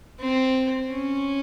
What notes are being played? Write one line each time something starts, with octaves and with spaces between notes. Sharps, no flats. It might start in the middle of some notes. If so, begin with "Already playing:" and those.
C4
C#4